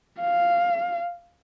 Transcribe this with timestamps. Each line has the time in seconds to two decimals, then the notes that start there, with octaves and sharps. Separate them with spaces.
0.20 F5